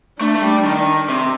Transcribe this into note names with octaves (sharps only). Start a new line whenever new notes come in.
A3 D4
A3
G3
D#3
C3